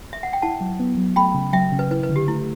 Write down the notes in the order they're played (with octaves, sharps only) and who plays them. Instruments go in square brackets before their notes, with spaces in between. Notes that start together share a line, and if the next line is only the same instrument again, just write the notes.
[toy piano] E5
F#5
G5
[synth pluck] E4 [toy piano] F#5 A5
[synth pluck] F#3
B3
F#3
[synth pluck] A3 [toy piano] G5 B5
[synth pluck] C#3
[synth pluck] F#3 [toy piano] E5 G5
[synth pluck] C#3
[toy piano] B4
[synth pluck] E4 [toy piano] B4
[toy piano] B4
[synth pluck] D3
[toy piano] G4
[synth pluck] A3 [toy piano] E4